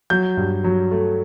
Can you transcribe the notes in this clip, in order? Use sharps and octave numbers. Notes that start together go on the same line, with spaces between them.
F#3 G6
G2
F#3
A3